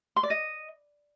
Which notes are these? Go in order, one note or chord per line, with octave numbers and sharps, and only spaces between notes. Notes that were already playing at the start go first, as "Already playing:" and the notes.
C6
D5
D#5